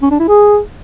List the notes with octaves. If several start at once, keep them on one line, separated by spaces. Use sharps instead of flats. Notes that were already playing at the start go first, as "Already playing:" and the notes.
C#4
D4
E4
G#4